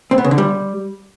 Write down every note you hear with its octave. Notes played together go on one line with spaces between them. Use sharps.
C4
B3
C#3
D3
G3